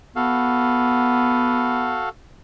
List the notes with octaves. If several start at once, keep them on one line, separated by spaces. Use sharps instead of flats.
B3 F#4 A4 F5